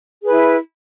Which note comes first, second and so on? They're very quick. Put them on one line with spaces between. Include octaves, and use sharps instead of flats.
G#4 B4 E4 E5